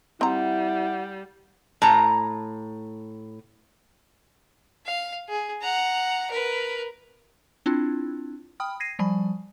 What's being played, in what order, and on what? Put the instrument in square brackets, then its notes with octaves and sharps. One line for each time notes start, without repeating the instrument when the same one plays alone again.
[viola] G3 [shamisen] C4 A#5 [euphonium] E4 [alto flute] F#5
[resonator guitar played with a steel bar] A2 A#5
[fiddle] F5
G#4
F#5 A#5
A#4 B4
[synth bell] C4 D4 E4 F4
G5 B5 D#6 F6
G#6 A#6 C7 D#7
F3 G3 G#5 B5